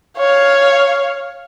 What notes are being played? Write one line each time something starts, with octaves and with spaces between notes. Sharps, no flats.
C#5 F5